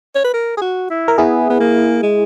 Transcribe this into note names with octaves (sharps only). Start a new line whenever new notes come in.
C#5
B4
A#4
G#4
F#4
E4
A#4
B3 E4 G#4
B3
A#3
G#3